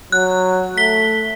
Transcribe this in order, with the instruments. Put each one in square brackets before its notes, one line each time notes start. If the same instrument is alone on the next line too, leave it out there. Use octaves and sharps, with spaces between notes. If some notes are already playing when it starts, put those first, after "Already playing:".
[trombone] F#3 [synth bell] F#6
[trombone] A3 [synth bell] B6 G7